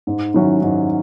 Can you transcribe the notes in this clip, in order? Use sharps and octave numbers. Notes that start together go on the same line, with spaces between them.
G#2
D#3 F#3 C#4 E4
G#2